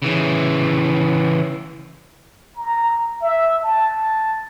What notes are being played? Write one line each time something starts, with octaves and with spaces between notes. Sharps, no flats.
C#3 E3
A#5
E5
A5